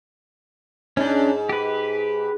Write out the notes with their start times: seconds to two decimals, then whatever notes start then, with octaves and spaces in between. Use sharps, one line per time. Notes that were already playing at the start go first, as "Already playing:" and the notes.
0.97 G#2 C#4 D4
1.49 G4 B4